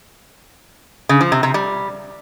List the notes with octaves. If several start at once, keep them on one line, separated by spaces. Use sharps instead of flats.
C#3
F3
C3
C3
G3